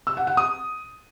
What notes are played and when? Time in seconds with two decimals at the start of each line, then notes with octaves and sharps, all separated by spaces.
0.07 E6
0.17 F#5
0.27 F#5
0.37 D#6